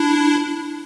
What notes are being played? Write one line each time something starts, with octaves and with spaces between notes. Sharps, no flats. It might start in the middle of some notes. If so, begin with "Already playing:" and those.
Already playing: D4 E4